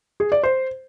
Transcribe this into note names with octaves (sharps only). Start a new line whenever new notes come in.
G#4
D5
C5